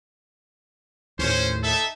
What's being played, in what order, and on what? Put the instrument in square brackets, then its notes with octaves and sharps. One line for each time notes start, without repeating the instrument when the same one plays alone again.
[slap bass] D#2 A2 [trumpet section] C#4 C5
[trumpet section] D#4 A4 E5